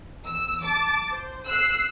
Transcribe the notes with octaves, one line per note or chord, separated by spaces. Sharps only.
E2 E6
A5 D6
C5
E6 F#6 C7